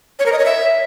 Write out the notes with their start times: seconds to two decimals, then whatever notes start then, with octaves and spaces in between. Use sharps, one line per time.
0.19 C#5
0.26 A#4
0.32 D#5
0.39 C#5
0.45 E5